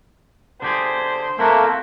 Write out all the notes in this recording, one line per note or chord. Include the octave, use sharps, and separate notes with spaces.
D3 G4 G#4 C5
A3 A#3 C4 E4 F#4 A5